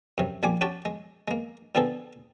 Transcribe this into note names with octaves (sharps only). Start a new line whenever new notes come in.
F#2 C3
A#1 G3 A#3 G#5 D6
C#4 F#4 G4 G5 A5
G#3
G#3 A#3
A#2 D3 B3 C4 G#4 A4